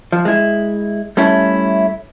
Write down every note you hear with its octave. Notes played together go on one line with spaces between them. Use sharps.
F3
G#3 E4
G3 A3 C#4 E4